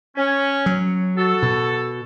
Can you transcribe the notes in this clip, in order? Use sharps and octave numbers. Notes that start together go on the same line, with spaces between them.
C#4
F#3
F#4 A4
B2